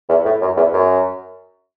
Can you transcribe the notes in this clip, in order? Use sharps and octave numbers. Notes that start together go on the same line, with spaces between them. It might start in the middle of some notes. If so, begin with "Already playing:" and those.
E2
A2
F#2
E2
F#2